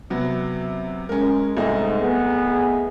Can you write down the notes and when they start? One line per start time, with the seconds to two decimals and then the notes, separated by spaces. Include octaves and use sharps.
0.10 C3 F#3 B3
1.09 G#3 C#4 A#4
1.57 C2 G#2 A3 D#5
2.02 B3 G#4